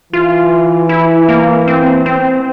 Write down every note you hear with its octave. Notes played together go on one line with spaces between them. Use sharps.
E3 F4
E4
A#3
C4
C4